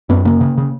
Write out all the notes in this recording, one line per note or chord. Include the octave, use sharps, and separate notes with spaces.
F#2 B3
C#3 A#3
C#3
C#3